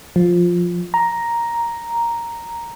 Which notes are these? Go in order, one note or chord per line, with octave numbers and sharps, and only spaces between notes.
F3
A#5